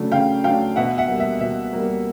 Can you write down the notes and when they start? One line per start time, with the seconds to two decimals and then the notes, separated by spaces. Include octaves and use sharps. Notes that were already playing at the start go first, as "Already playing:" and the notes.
Already playing: C#3 F#3 A3 D4
0.12 C#3 F5 G5
0.44 F#3 A3 D4 F5 G5
0.76 B2 E5 F#5
0.98 E5 F#5
1.09 G3 A#3
1.20 E5
1.40 B2 E5
1.73 G3 A#3